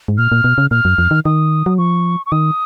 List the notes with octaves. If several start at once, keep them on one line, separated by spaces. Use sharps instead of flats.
G#2
A#2 F6
A#2
B2
C#3
A#2 F6
F#2
F2
D#3
D#3 D#6
F#3
F3 C#6
C#6
D#3 D#6